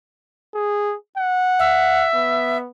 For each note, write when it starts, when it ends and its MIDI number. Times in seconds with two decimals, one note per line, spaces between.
0.54 0.95 68
1.17 2.10 78
1.59 2.57 76
2.15 2.69 59